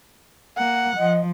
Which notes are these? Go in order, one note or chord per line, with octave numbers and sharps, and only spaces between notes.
A#3 F#5
F3 D#5